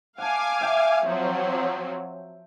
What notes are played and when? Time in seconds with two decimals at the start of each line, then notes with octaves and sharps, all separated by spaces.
0.18 F5 F#5 G#5 A5 D6
0.61 E5 G5 A5
1.06 F3 F#3 C4